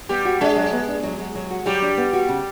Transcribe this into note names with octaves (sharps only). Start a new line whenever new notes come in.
G3 B3 G4
F#4
G#3 D4 G#4
F#3
B3
D4
F#3
F#3
F#3
F#4
F#3 G3 G4
D4
B3
F#4
C#3